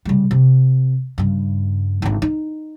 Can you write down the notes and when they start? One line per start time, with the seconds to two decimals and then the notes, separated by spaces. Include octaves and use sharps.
0.05 C#3 G3
0.31 C3
1.18 G2 C#3
2.02 G#1 D3
2.22 D#4